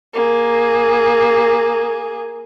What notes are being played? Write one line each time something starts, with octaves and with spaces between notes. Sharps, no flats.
A#3 G#4